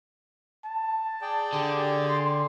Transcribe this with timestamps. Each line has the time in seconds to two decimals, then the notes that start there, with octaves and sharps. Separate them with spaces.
0.65 A5
1.22 G#4 D5 G5
1.53 D3 G4
2.06 C6